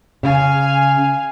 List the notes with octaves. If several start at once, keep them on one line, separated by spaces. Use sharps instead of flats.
C#3 F5 G#5